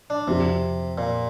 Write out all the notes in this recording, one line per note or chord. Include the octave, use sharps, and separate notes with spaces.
D4
F2 C3 F3 C4 G4
A#2